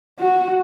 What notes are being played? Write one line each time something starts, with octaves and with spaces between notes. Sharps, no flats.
F#4